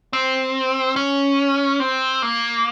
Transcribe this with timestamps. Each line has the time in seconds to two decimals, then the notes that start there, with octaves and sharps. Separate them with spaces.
0.13 C4
0.96 C#4
1.80 C4
2.22 A#3